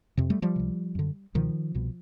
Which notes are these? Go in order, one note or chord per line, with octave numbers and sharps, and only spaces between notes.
F2 C3
G3 A3
F3 G3
C#2 C3
F#2 D3
C#2 B2 D#3 F3
C2 B2